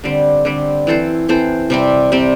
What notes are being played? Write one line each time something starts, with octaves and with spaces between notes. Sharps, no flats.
D3 G3 C4
D3 G3 C4
E3 C4 A4 C5
E3 C4 A4 C5
C3 G3 C4
C3 G3 C4